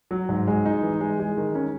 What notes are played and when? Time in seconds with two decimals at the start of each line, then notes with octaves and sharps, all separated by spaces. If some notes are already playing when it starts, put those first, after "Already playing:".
0.11 F#3
0.29 G#2
0.48 G#3
0.66 D#4
0.83 E3
1.01 G#3
1.20 G#3
1.37 D#3
1.55 C#4